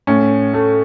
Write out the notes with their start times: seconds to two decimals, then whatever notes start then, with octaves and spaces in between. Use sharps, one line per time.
0.07 A2 C#4
0.54 A3